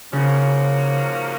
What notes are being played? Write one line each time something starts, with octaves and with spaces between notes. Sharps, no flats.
G#2 C#3 F3 A#3 C#4 F#4